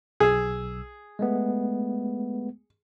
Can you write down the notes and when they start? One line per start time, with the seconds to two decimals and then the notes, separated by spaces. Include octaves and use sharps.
0.20 B1 G#4 E6
1.19 G#3 A3 B3